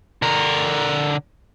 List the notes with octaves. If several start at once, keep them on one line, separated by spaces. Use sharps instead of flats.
D3 A#4